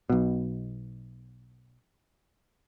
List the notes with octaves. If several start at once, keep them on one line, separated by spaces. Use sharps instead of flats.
B1 B2